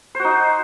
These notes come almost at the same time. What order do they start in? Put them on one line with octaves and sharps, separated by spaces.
C5 F#4 D#4